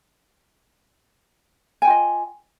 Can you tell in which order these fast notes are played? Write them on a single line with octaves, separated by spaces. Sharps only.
G#5 G5 F4 D#5